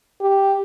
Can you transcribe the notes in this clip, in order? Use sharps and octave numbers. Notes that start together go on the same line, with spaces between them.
G4